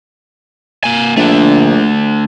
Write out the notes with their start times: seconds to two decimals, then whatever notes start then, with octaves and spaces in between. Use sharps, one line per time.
0.84 A#3 G#5
1.17 A#1 D3 A3